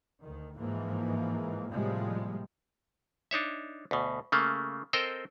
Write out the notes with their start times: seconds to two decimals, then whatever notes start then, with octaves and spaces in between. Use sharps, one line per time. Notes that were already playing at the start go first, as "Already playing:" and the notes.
0.21 D2 D#3
0.56 G#2 E3 F3 A#3
1.70 A2 C3 F3 G3 G#3 A#3
3.31 D4 D#4 C#5 E5
3.91 D2 B2
4.32 C#3 A3 A#3
4.93 C4 A4 A#4 C5 D#5 G5